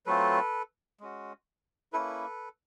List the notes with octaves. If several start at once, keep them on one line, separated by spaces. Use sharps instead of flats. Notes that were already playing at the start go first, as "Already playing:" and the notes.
F#3 A3 C4 F4 A4 B4
G#3 C#4 F#4
A#3 C#4 E4 A4 B4